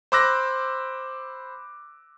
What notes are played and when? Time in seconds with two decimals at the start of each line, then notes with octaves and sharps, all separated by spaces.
0.12 C5 B5 D6 E6 F#6 A#6